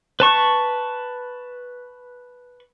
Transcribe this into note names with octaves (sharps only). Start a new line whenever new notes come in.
B4 A5 C#6